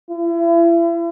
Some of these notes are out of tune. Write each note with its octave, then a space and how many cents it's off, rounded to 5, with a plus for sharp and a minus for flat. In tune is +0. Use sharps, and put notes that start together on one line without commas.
E4 +40